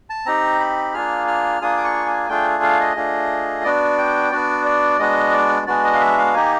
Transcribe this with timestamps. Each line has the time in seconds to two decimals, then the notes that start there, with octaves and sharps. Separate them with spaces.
0.10 A5
0.26 C4 D#4 G4 A#5
0.60 B5
0.94 A#3 D4 F4 G#4 F6
1.27 F6
1.61 A#3 D4 F4 G#4 D#6
1.77 D6
1.84 C#6
2.06 G#5
2.29 A3 D4 F4 G#4 G5
2.63 F5
2.80 D#5
2.96 A3 D4 F4 G#4
3.64 B3 D4 F#4 D5
3.98 G5
4.32 B3 D4 F#4 D5
4.66 D5
4.99 G#3 B3 D4 F#4 D#5
5.33 D5
5.67 G#3 B3 D4 F#4 D5
5.84 D#5
5.95 F5
6.01 E5
6.18 F5
6.34 A#3 D#4 G4 G#5